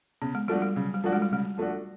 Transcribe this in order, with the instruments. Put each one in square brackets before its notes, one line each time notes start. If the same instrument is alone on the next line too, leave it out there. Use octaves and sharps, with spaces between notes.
[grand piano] C#3 [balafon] B3
[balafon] G#3
[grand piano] F3 A3 D4 F#4 [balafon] G3
[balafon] G3
[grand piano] C#3 [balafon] F#3
[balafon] G3
[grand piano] F3 A3 D4 F#4
[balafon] G#3
G3
[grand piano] C#3 [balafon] G#3
[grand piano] F3 A3 D4 F#4